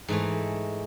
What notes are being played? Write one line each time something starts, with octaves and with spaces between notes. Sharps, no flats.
G#2 E3 A3